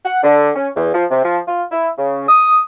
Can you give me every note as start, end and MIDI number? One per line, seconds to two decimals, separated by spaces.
0.05 0.18 78
0.23 0.50 50
0.55 0.70 61
0.76 0.92 40
0.95 1.05 53
1.11 1.24 48
1.24 1.39 53
1.47 1.64 65
1.72 1.90 64
1.98 2.25 49
2.28 2.61 87